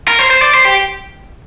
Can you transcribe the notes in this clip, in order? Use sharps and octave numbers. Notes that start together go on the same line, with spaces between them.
A#4
C5
C5
D5
C5
G4